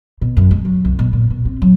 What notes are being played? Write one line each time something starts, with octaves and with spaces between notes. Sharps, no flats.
B2
F#2
G#3
F#3
C2
B2
A#2
B2
C4
F#3